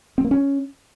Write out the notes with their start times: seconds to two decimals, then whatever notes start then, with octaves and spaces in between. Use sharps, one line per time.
0.18 C4
0.25 A#3
0.31 C#4